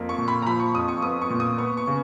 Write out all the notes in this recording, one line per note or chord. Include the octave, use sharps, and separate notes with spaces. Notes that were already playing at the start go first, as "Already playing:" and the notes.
Already playing: F2 A#3
C#6
A#2
B5
A#5
F3 B5
C#6
F2 D#6
C#6
B3 D#6
C#6
A#2
D#6
B3 C#6
C#6
C#3